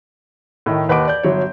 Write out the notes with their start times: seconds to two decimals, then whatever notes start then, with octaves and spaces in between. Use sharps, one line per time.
0.66 A2 D#3
0.89 D#2 B4 D#5 F#5 D6 D7
1.08 D5 G6
1.23 G1 F#3 C#5